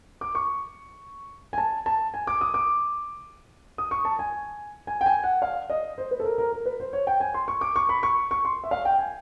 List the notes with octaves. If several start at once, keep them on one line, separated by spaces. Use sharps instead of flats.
D6
C#6
G#5
A5
A5
G#5
D6
D#6
D6
D#6
C#6
A5
G#5
G#5
G5
G#5
F#5
F5
D#5
C5
B4
A4
A#4
A#4
A#4
B4
C5
C#5
G5
G#5
C6
C#6
D6
C#6
B5
C#6
C#6
C6
E5
F5
G5
G#5